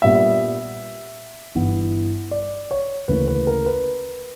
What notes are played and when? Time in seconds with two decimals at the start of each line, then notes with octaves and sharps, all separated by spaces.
0.02 A#2 G3 B3 D4 E5
1.55 G1 G2 E3 B3 E4
2.31 D5
2.71 C#5
3.08 D2 C#3 E3 A#3 B4
3.28 B4
3.47 A#4
3.66 B4